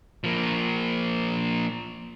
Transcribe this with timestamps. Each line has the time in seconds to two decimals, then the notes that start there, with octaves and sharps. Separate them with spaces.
0.24 F3 A#3